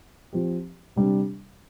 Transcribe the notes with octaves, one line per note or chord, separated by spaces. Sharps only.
F3 C4 G4
C3 G3 D4